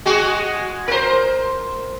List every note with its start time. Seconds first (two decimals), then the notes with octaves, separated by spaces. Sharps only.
0.06 G#3 F#4 G#4
0.88 A#4 C5